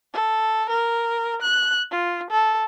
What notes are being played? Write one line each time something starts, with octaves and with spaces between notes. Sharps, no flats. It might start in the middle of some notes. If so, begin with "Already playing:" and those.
A4
A#4
F#6
F4
A4